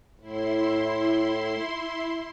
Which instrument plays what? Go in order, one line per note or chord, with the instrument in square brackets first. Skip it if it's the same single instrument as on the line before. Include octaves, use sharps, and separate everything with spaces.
[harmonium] A2 [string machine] E4 C6